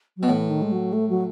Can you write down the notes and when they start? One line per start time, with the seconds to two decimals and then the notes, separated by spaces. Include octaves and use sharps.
0.17 F#3
0.23 B2
0.28 A2 E3
0.50 D#3
0.62 G#3
0.72 F#3
0.93 A3
1.09 F#3